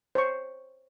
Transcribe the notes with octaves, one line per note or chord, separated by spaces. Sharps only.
C5 C#5 C#6